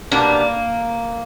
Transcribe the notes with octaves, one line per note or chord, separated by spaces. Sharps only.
B2 G3 A#3 B3 D4